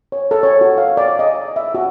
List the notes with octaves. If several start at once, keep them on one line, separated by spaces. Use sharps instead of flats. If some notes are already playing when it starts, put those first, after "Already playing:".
C#5
A4
C#5
F#4
F5
D5
D#5
E5
F#4